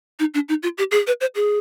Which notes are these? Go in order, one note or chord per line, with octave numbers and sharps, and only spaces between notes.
D#4
D4
D#4
F4
G4
G#4
B4
C5
G#4